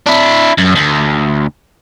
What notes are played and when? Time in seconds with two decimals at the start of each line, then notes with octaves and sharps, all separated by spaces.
0.06 D4 E4
0.58 F#2
0.76 D2